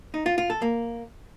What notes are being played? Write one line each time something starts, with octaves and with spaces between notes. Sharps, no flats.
D#4
F4
F4
A4
A#3